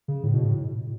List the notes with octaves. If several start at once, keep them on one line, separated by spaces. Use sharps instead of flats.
C#3
A2
B2
A2